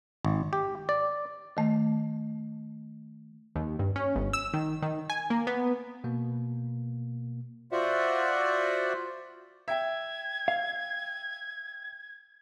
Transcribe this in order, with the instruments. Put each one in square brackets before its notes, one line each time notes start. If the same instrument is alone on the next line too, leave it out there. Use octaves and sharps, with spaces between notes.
[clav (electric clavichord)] G#1
G4
D5
[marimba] D#3 A3
[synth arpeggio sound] D#2
G2
C#4
G1
E6
D#3
D#3
G#5
A#3
B3
[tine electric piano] B2 A#3
[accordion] F4 F#4 C5 D5 E5 F#5
[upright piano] E5 G5 [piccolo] G#6
[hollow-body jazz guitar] F5